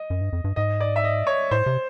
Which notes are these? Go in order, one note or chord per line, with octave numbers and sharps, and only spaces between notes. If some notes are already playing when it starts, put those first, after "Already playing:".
Already playing: D#5
F#2
G2
F2
G2
G#2 D#5
D5
E5
D#5
C#5
A2 C5
C3